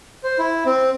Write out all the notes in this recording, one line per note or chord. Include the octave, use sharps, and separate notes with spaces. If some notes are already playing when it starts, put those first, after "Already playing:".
C5
E4
C4